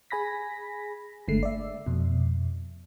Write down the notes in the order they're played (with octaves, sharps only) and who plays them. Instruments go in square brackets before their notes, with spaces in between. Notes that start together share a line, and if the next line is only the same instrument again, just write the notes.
[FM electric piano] G#4 G#5 B5 A#6 B6
G1 D3 G#3 A3 C7
D5 E5
F2 B2